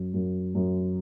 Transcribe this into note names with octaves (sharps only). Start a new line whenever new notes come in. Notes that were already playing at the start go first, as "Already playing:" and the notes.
Already playing: F#2
F#2
F#2